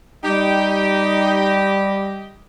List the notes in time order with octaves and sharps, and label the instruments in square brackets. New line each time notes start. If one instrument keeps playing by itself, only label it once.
[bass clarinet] G3 [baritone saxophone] D#4 [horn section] G4 D#5